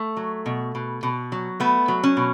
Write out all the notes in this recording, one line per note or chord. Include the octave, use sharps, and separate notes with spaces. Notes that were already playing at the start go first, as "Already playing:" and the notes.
Already playing: A3
F#3
B2
B2
B2
F#3
A3 B3
F#3
C#4
B2